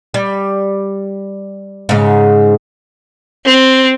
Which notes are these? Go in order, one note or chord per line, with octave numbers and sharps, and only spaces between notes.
G3
G#2 C#3
C4